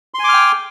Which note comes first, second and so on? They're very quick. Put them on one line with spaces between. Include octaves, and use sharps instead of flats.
C6 G#5 D6 F6 G5